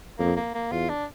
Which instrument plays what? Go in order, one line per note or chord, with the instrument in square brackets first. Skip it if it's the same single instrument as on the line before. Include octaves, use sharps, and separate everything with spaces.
[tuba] F2 [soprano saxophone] A#3
[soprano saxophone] A#3
A#3
[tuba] E2 [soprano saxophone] F4
[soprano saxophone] D4